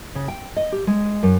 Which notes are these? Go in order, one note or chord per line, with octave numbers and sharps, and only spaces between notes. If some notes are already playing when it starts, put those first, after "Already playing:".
C#3
G5
D#5
G4
G#3
F#2